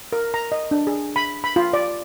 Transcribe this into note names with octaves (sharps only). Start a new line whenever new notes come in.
A#4
A#5
D#5
D4
G#4
B5
B5
F4
D5